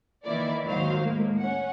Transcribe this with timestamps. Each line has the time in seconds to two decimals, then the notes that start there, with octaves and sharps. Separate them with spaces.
0.25 D#3 E3 A#3 E4 D5
0.64 D#2 G#2 D#3 F#3 C5 F5
1.00 A2 G#3 A#3
1.39 C#4 F#5